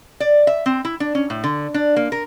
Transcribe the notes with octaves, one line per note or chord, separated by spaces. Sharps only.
D5
E5
C4
E4
D4
C#4
A2
D3
D4
A#3
A#4